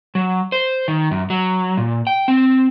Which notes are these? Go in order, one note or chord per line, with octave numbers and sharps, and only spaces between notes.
F#3
C5
D#3
F#2
F#3
A#2
G5
C4